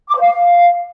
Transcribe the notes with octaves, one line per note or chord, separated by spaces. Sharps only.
D6
C5
F5